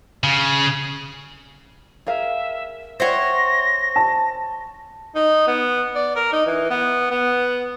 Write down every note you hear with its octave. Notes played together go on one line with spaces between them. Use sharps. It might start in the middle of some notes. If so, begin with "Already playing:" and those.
C#3
G#4 A#4 E5 F5
C5 C#5 E5 F#5 G5 A#6
A5
D#4
B3
D5
A#4
D#4
E3
B3
B3